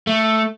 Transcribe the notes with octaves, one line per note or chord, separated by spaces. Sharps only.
A3